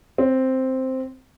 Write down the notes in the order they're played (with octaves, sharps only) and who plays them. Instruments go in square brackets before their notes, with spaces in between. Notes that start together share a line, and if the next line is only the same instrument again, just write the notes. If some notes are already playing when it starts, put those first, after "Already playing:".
[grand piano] C4